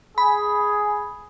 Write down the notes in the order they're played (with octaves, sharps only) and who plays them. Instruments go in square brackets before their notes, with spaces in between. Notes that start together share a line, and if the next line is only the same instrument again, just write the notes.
[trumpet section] G#4 [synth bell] B5